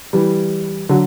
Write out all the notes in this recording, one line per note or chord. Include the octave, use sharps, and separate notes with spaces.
E3 G3
D3 F#3